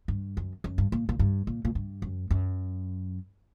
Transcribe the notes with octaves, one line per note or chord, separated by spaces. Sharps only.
G2
F#2
F#2
G2
A#2
A#2
G2
A#2
A#2
G2
F#2
F#2